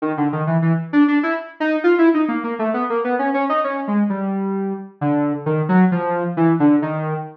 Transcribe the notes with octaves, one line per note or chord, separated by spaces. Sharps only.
D#3
D3
D#3
E3
E3
D4
D4
E4
D#4
F4
E4
D#4
A#3
A#3
A3
B3
A#3
B3
C#4
C#4
D#4
C#4
G#3
G3
D3
D#3
F#3
F3
E3
D3
D#3